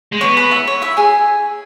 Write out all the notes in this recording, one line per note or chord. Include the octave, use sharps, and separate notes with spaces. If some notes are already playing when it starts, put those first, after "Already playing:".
G#3
B3 C#5 C#6
B4 B5
E4 E5
C#5
E4 E5
G#4 G#5